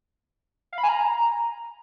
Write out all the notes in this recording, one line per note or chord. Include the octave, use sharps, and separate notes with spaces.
F5
B5
G#5
A#5